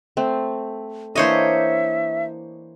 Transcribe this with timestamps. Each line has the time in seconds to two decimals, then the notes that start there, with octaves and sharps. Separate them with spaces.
0.17 A3 C4
1.15 E3 A#3 D4 C5 C#5 D#5 E5